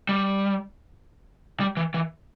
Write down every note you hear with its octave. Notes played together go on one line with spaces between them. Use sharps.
G3
G3
E3
E3